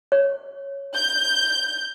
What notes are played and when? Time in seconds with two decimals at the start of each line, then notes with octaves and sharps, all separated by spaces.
0.12 C#5
0.95 G6